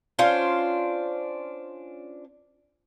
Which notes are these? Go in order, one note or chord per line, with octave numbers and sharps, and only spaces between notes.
C#4 D4 F4 C5